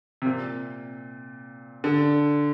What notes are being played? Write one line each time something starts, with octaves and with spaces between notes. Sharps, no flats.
C3
A#2
D3